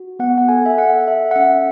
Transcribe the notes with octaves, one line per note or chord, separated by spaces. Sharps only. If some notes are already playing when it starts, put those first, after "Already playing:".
Already playing: F#4
B3 F#5
F#5
A4 G#5
E5
A4 F#5
A4 E5
F#5
C#4 E5